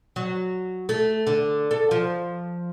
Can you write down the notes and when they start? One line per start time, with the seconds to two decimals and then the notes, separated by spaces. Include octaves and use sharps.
0.16 F#3
0.89 A3
1.27 D3
1.71 A4
1.91 F3